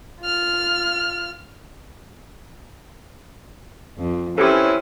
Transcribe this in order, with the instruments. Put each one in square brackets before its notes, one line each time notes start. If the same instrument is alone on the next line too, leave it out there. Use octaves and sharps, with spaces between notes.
[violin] F4 F6
[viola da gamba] F2
[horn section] E3 C4 C#4 [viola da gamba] E4 [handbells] G4 A4